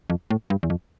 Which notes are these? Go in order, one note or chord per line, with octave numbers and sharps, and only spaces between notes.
F2
A2
G2
E2
F2